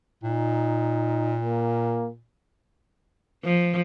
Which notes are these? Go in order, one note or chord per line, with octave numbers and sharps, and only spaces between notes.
A#2 D#4
A#3
F3